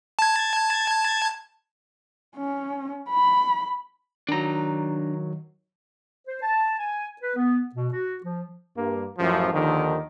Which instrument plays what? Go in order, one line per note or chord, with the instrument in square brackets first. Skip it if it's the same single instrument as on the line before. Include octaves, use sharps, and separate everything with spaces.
[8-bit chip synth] A5 G#6
[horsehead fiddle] C#4
B5
[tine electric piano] D#3 F#3 [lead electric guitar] D4 A#5
[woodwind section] C5
A5
G#5
B4
B3
B2
F#4
F3
[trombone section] G2 A#3
A1 F#2 F3
D#2 D3 D#3 F3